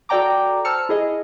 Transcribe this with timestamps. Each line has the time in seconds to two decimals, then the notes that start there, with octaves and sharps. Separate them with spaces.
0.09 F#4 A4 D5 G5 A#5 D6
0.65 C5 A5 E6 F6 C#7
0.89 E4 G#4 D#5